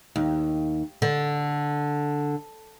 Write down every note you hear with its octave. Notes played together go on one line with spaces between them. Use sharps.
D#2
D3